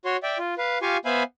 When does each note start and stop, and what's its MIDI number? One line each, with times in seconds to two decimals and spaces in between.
0.05 0.17 66
0.05 0.17 73
0.05 0.17 84
0.23 0.38 74
0.23 0.38 76
0.23 0.38 79
0.39 0.55 65
0.58 0.78 71
0.58 0.78 77
0.82 0.97 65
0.82 0.97 67
0.82 0.97 77
0.82 0.97 80
0.82 0.97 85
1.05 1.23 59
1.05 1.23 72
1.05 1.23 76
1.05 1.23 77
1.05 1.23 80
1.05 1.23 83